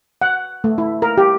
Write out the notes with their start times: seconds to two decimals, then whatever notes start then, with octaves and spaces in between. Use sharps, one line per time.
0.22 F#5
0.64 A3
0.78 E4
1.02 A#4
1.18 G4